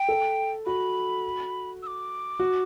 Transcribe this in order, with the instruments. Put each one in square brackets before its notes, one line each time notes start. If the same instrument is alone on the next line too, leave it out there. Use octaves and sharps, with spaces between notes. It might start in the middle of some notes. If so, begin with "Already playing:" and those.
Already playing: [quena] G5
[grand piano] A4
[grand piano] F#4 [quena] B5
[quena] E6
D6
[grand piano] F#4